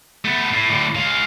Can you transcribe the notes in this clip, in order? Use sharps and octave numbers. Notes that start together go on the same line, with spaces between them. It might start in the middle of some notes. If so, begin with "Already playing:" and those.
A3 B3
A2
A2 D3
G#3 F5